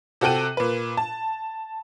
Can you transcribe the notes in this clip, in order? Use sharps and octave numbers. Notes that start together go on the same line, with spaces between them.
C3 F#4 A4 G5 F#6 D#7
A#2 B4
A5